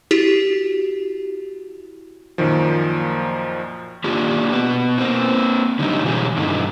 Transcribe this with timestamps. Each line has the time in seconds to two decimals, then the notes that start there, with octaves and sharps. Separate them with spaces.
0.11 E4 F#4 G4
2.38 F#2 A#2 D#3 F3
4.04 A#3 D4 F4 G4
4.53 B2 B3
4.98 A#3 C4
5.79 D3 F#3 G3 D#4
6.03 B2 E3 F#3 G3 G#4
6.37 G2 D3 E3 A3 D#4